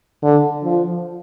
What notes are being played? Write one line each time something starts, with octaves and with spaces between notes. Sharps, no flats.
D3
F3